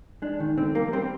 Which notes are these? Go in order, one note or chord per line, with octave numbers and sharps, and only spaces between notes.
G#3 D4
D#3
D3 C4
G3 A#3
G3 C4